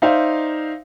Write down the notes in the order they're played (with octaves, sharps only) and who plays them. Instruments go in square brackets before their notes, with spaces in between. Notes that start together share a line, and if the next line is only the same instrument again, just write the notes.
[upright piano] D#4 C5 D5 E5 F5